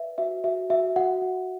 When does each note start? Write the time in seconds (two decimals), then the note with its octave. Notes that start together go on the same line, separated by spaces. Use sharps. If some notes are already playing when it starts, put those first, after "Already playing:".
Already playing: B4 D5 E5
0.18 F#4 E5
0.44 F#4 E5
0.70 F#4 E5
0.96 F#4 F#5
1.22 F#4